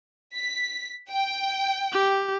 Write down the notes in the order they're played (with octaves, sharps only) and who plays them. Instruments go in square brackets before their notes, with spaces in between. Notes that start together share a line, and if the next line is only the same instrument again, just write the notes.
[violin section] B6
G5
[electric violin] G4